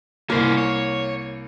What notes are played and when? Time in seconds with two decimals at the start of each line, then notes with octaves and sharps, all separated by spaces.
0.30 C2 A#3 C#4 C5
0.58 C#5